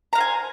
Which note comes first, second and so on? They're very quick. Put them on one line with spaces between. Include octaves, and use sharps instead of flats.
A#5 F5 C5 G#5